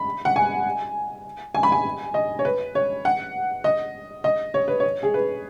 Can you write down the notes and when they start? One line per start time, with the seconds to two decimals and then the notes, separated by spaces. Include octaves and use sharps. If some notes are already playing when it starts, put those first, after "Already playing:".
Already playing: B5
0.25 F#5
0.36 G#5
1.55 G#5
1.63 B5
1.72 G#5
2.14 D#5
2.39 C#5
2.45 B4
2.75 C#5
3.05 F#5
3.64 D#5
4.24 D#5
4.54 C#5
4.68 B4
4.80 C#5
5.03 G#4
5.14 B4